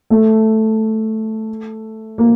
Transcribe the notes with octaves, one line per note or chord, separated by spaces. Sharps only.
A3
A#3